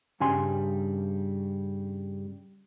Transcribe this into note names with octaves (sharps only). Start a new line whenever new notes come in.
G2 C#3 G3 G#5 C6